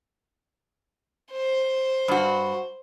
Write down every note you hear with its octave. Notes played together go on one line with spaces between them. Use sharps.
C5
G2 F#4